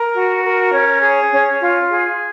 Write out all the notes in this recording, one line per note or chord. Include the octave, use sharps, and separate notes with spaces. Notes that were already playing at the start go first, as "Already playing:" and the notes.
Already playing: A#4
F#4
A#4
C#4
G#4
C#4
F4
G#4